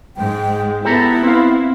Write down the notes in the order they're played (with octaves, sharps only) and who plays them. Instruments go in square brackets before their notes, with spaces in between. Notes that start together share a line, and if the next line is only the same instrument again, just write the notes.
[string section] G#2 G#3 [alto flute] G5
[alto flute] B3 [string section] E4 [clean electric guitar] G4 A4 A#5
[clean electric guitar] C4 F5